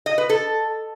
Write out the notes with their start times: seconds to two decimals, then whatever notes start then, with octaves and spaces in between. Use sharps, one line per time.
0.06 D#5
0.18 B4
0.29 A4